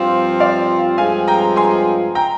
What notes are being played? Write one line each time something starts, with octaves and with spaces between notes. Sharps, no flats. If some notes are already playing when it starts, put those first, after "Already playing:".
Already playing: G2 F3 C4 F4 C5
D5 F5
G2 F3 G#3 C4 F4 F5 G#5
G5 A#5
G#5 C6
G5 A#5